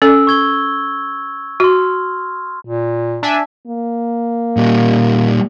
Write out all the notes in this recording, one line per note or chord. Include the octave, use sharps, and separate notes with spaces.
C#4 A4 E6
C#6 G#6 G7
F#4 C6 F6
A#2
D4 E5 G#5
A#3
A#2 G3